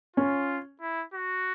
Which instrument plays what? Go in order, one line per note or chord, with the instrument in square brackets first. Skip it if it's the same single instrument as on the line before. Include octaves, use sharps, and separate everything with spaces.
[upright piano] C#4 [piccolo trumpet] F4
[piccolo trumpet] E4
F#4